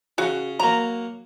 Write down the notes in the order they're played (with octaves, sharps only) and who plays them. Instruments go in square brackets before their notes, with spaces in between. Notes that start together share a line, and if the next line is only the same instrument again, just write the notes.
[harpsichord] C#3 [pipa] F#4
[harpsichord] F#3 A#3 [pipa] A#5